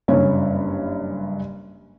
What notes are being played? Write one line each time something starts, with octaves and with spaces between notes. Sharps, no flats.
F#1 G2 C#4 C#5